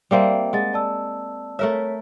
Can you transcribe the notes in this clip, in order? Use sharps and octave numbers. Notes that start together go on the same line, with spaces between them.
G3 A#3 C4 E5 G5
G#3 F#5 A6
D5 A5 E6
A3 A#4 C#5 E5